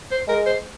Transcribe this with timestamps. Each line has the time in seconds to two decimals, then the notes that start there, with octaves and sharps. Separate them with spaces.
0.11 C5
0.28 G#3 A#4
0.46 C5